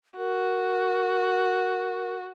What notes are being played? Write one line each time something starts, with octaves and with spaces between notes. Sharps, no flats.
F#4 A#4